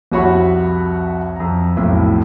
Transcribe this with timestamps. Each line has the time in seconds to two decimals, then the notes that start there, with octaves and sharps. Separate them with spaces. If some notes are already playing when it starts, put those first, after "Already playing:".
0.12 C2 F2 F#4 C#5 B5 C#6
1.36 F2 A#5
1.77 B1 F2 A2